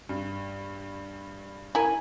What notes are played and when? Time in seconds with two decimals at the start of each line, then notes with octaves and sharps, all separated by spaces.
0.09 G2
1.75 E4 A#4 G#5